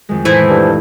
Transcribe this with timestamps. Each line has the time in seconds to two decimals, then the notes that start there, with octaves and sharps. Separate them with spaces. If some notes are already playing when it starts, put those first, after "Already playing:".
0.09 F2 D#3 G#3
0.25 A2 E3 A3 D#4 E4 C5
0.50 G2